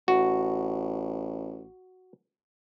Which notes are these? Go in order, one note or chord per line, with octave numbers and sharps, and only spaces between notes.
A1 F#4